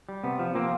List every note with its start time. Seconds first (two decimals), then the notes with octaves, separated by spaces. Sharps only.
0.09 G3
0.24 C3 B3
0.39 F3
0.55 F3 A#3 C4